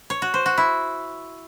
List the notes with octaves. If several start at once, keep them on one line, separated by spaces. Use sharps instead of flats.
C#5
F#4
C5
F#4
E4